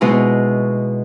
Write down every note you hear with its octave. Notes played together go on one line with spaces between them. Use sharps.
B2 G#3 D#4 E4